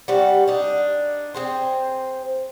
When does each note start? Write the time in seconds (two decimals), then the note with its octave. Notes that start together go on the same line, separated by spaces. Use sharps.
0.08 G3 C4 F#4 D5
0.48 D4 D#4
1.34 C4 G#4 C5